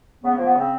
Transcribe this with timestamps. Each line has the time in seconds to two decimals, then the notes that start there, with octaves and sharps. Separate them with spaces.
0.22 C#3 B3
0.33 A#3
0.39 F3
0.44 B3
0.55 C#3 C4